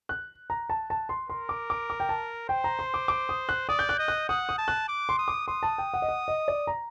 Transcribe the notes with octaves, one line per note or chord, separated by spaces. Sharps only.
F#6
A#5
A5
A5
C6
A#4 C6
D6
D6
D6
G5
A5
C5 G5
A#5
C6
D6
D6
D#6
F#6
D5 D#6
G6
F#6
D#5
F#6
F#5 D#6
D#6
A5
F#6
D6
C6
D#6
D6
C6 D#6
A5
G5
F#5
D#5
F#5
D#5
D5
A#5